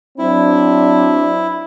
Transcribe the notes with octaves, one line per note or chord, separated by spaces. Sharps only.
F#3 C4 D4 E4